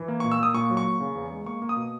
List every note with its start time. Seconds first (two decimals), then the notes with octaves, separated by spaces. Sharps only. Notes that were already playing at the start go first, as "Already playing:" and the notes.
Already playing: E3
0.08 A#3
0.20 A#2 C#6
0.32 E6
0.39 A#3 D#6
0.54 A#2 C#6
0.70 F#3
0.77 C#6
0.85 A#3
1.00 C#3
1.16 E2
1.31 G#3
1.46 A#3 C#6
1.62 A#3
1.69 D#6
1.76 B2